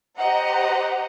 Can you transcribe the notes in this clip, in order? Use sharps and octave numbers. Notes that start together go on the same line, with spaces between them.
G4 C5 D#5 F#5 A#5